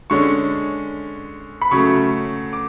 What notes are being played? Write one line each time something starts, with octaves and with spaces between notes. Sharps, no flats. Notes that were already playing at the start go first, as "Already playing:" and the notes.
D3 G#3 C#4 C#6
B5
C#3 F#3 A3 C#6
D6